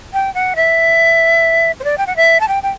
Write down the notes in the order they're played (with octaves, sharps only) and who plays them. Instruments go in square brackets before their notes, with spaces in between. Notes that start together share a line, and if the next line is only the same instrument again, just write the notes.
[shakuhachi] G5
F#5
E5
C5
D5
G5
F#5
E5
A5
G5
G5